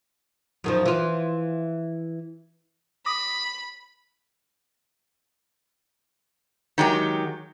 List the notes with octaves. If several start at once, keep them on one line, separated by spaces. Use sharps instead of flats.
F#2 D#3 F3
E3 F4
B5 D6 D#6 A#6
D#3 F#3 G#3 G4